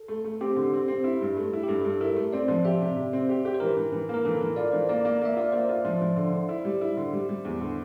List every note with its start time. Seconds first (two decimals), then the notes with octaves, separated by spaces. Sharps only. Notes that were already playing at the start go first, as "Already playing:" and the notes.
Already playing: A4
0.08 A3
0.24 A3
0.41 C4 G4
0.56 D3
0.73 C4
0.88 C4
1.04 E4
1.21 G2
1.37 A3
1.53 E4
1.63 G4
1.68 G2 A4
1.85 G2
1.90 A4
2.01 E4 A#4
2.17 A3
2.32 C4 D5
2.48 F3
2.65 G4 E5
2.81 C3
2.96 C3
3.13 C4
3.29 G4
3.45 G4
3.54 C5
3.60 E3 A#4
3.76 E3
3.92 E3
4.09 A#3 A#4
4.25 E3 A4
4.41 E3 A#4
4.56 F4 D5
4.72 E3 C5
4.89 A#3 D5
5.05 A#3
5.21 A#3 E5
5.37 F4 D5
5.52 A#3 C5
5.69 F4
5.85 F3
6.01 F3
6.16 D3
6.32 D3
6.49 E4
6.65 G3
6.81 E4
6.97 D3
7.13 G3
7.29 G3
7.45 E2
7.61 D3